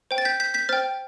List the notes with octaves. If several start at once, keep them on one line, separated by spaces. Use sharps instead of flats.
C5 G5
A6
G6 B6
G6 B6
G6 B6
C5 G5 F6 A6